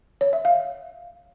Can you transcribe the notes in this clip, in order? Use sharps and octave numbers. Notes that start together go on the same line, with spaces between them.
C#5
E5
F5